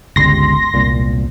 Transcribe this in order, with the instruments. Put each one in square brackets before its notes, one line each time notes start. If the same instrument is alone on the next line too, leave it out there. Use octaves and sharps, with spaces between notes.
[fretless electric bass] G1 C#2 G3 [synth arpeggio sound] C6 A#6
[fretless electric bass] E1 C2 A#2